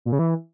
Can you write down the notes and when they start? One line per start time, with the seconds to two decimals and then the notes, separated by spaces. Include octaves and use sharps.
0.05 A#2
0.12 C#3
0.19 E3